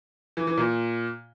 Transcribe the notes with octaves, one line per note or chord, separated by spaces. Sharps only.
E3
E3
A#2